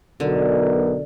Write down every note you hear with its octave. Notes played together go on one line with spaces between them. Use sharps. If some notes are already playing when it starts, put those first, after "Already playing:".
B1 B2 D3 A#4